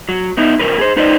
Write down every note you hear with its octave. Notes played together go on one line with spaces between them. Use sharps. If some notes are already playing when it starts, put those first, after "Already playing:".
F#3
B3 D#4 E4
F2 C#3 A#4 B4
G#4 C5
D#4 B4 C5 D5 D#5